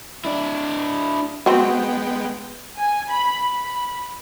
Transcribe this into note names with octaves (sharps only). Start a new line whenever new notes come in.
D4 E4
F#3 G#3 B3 C4 G5
G#5
B5
B5